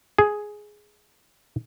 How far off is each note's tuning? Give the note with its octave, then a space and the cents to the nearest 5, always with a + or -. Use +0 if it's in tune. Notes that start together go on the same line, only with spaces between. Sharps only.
G#4 +5